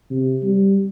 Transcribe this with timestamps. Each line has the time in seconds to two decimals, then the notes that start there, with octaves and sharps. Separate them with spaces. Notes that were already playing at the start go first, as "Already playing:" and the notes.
0.11 C3
0.43 G3